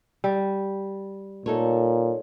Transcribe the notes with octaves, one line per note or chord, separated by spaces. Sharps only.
G3
A#2 D#4 A4 C#5